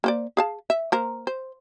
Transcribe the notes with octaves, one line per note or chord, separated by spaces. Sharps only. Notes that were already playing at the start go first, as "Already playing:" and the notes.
A#3 C5 D5
G#4 F5 A5
E5
A#3 A#4 C5
C5